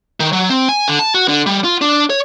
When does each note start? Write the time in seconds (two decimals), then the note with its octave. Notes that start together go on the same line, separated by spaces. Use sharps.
0.20 D#3
0.32 F#3
0.49 C4
0.69 G#5
0.88 D3
0.99 A5
1.14 F#4
1.28 D3
1.46 G3
1.64 F4
1.81 D4
2.10 C#5